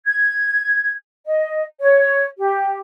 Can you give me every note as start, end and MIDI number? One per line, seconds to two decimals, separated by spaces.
0.05 0.92 92
1.26 1.63 75
1.80 2.25 73
2.38 2.77 67